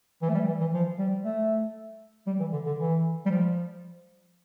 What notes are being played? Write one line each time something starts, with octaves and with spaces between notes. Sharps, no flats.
E3
A3
G3
E3
E3
F3
G3
A3
G3
E3
D3
D3
E3
G3
F3